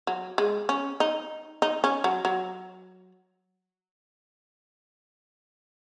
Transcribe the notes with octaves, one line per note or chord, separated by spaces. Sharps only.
F#3
G#3
C#4
D#4
D#4
C#4
F#3
F#3